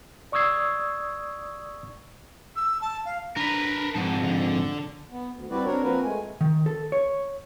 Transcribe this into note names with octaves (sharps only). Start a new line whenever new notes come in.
D5 C#6 D#6 E6 G#6 C7
E6
A5
F5
D4 A#4 B4
F2 G#2 F#5 A5
D3
B3
D2
G3 C4 E4 F#4 B4 D5
C4 D4 F#4 A#4 C#5
F3 A#3 C4 F#4 A#4 B4
G#3 A3 G#5
D#3
A4
C#5